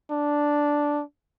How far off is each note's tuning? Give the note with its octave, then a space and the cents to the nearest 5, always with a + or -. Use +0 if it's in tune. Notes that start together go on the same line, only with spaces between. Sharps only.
D4 -5